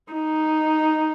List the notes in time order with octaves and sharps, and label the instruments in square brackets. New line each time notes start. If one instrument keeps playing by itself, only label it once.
[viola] D#4